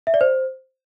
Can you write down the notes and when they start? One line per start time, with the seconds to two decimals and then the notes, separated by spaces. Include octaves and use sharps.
0.07 E5
0.14 D5
0.21 C5